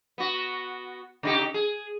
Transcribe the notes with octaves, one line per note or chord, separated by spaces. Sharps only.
B3 F#4
C#3 D#4 G4
G#4